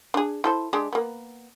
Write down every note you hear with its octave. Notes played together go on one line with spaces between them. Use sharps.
D4 G#4
E4 A4 C5
G#3 D4 G4
A#3 B3